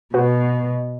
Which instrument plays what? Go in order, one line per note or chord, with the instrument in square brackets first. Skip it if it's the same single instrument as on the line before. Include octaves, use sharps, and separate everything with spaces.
[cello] B2 [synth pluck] F#4 B4